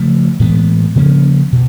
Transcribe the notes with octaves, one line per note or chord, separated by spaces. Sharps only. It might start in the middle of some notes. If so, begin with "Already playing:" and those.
Already playing: C#3 F3 A3
A2 E3 G#3 B3
C#3 F3 A#3 C#4
B2